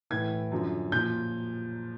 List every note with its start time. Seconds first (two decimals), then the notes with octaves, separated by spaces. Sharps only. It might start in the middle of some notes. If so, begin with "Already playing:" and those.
0.10 A2 E3 G#6
0.52 F#2 D3 F3
0.92 A#2 F3 G6